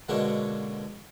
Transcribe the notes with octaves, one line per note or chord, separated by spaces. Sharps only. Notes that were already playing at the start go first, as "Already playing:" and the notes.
B2 D3 G#3 A#3 C#4 D4